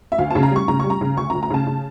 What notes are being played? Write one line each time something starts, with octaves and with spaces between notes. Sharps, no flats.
E5
D2 F5
C#3 A5
A#5
G3 C#6
C#3 A#5
G3 C#6
A#5
C#3
D2 C#6
D2 A#5
A#5
C#3 A5
C#3